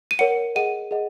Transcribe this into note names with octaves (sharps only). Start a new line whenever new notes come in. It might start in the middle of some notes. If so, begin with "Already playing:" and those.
D#7
A#4 C#5 F#5 C#7
G#4 D#5 F#5 D#7
G#4 D#5 F#5